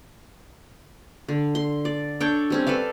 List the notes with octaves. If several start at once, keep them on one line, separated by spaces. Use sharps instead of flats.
D3
C6
D5
D4 A4 C#5 G5
G3 C4 C#4
A4 B4 D5 F5